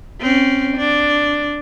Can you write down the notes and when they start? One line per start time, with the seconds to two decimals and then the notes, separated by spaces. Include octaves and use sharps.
0.21 C4 C#4
0.77 D4